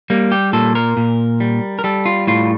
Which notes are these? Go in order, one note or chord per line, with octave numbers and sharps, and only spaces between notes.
G3 A#3
G4
A#2 A4
A#4
A#2
G3
A#4
G3 A4
F4
A2 F4